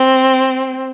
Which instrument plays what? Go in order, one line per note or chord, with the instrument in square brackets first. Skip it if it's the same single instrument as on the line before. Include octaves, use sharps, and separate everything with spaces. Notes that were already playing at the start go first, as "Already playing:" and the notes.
Already playing: [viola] C4